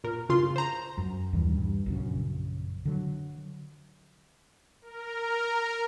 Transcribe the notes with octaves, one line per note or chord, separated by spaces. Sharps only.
A#2 A#4
G1 C#3 F4 C6
C5 A#5
F#2
A#1 D#2 E3 G3
G2
A#1 F#2 C#3
D3 F#3
A#4